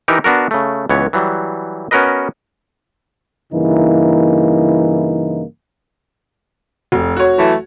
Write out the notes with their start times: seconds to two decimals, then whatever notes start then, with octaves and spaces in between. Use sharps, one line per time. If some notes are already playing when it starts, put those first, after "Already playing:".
0.08 E3 D#4 G4 A#4
0.24 B3 D4 F#4 A#4
0.51 C#3 A3
0.90 C#2 E3 B3 C#5
1.13 E3 F#3 G3
1.91 B3 C#4 F#4 A#4 B4 D#5
3.53 G2 C#3 E3 A#3 D#4 E4
6.92 F1
7.16 F#4 C#5
7.38 E3 F#3 A3